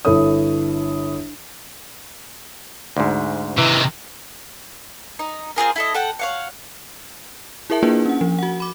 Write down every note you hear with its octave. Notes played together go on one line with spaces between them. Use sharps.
G1 E4 A4 C#5 D#6
D2 G#2
C3 D#3 E3
D#4
C4 F4 G#4 A#4
E4 A4 D#5
A4 F#5 G5
C#5 F5 F#5
E4 G#4 A#4 E5 A5
A#3 D4 E4 F4 G#4 B4
C#4 F#5
F3
F#4 F#5
B5 D6